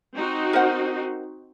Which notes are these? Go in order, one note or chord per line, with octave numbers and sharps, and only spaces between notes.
C4 D#4 F#4
A#4 C5 F#5